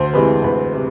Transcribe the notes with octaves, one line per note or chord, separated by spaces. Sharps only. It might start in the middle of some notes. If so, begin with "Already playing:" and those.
Already playing: D2 C5
C3 E3 G#3 B4
D2 B4
C3